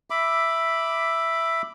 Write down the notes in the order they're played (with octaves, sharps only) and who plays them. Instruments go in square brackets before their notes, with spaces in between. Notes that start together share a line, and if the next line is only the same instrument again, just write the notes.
[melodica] E5 B5 D6